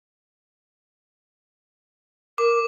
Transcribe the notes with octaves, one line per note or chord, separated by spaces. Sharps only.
A#4 D6